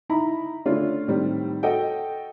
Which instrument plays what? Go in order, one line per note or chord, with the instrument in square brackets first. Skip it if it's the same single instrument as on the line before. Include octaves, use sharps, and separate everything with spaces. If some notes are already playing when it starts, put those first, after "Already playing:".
[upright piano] D#4 E4 A#5 B5
D3 A3 C#4 D4 F4
A2 D#3 G3 C4
F#4 A4 D#5 F#5 G5